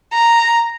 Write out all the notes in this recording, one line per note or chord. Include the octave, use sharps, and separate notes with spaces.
A#5